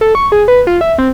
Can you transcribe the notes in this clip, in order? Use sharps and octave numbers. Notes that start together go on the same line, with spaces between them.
A4
C#6
G#4
B4
F4
E5
C4